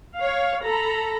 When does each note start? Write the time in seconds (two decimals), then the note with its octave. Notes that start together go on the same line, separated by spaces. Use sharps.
0.16 C#5 F5
0.65 A4 A#5 B5